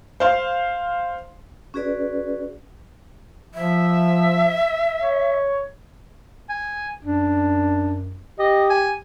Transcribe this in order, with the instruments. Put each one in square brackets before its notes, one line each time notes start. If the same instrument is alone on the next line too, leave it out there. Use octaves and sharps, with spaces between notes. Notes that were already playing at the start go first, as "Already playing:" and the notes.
[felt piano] C5 F5 C6
[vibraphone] C#4 F#4 G#4 B4 D5
[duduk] F3 [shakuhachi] E5
[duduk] C#5
[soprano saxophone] G#5
[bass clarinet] F#2 [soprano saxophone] D4
[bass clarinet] G4 [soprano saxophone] D#5
[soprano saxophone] G#5